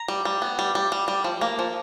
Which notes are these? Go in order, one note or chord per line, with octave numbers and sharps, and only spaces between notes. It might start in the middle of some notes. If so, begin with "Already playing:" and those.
Already playing: A#5
G3
G3
B3
G3
G3
G3
G3
F3
A#3
F3